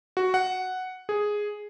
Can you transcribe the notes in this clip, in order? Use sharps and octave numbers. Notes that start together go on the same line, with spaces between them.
F#4
F#5
G#4